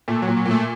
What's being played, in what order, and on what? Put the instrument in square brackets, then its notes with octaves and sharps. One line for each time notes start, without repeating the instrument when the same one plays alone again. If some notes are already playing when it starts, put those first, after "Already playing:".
[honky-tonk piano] A#2 [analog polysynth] A3
[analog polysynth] F#3
[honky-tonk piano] A#2
[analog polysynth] F#3
[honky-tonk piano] A#2
[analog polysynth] A3